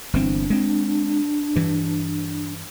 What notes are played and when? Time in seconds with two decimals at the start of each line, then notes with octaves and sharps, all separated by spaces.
0.13 G1 E3 C4 D4
0.50 G#3 C4
1.56 G2 E3